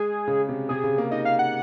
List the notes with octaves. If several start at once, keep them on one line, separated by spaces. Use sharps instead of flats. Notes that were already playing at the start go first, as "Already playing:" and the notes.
Already playing: G#3 G#4
C#3
C3
C3 G#4
C#3
A#3
D#4 D#5
F5
F#5